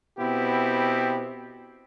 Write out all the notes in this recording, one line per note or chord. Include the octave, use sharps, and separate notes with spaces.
B2 B3 C4 E4 G4